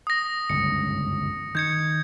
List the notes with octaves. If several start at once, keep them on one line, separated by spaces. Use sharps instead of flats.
D#6 A#6
G1 C#2 F#2 C#7
D#3 G6 G#6 C#7